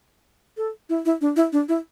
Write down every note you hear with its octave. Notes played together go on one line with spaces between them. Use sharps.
A4
E4
E4
D4
E4
D4
E4